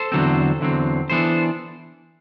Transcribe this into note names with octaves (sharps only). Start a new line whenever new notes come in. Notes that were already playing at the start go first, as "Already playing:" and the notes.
Already playing: A4 C5
E2 D3 F#3 C4
E2 D3 F#3 C4
E3 B3 D4 A4 C5